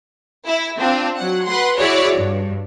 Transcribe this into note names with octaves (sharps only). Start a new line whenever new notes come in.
E4
C4 D4 F4
F#3 F#5
B4 F#5 C6
E4 F#4 G#4 C#5 D5
G2